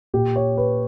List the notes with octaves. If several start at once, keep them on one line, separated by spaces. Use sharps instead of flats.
A#2 G4
C#5
B4